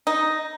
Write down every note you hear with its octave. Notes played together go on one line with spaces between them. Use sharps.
D#4